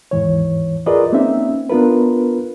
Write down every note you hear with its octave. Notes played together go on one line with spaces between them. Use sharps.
D#2 G#2 E3 C#5
F4 G#4 A#4 B4 D5 D#5
A#3 C4 C#4 D#4 E5
B3 D4 F4 A#4 B4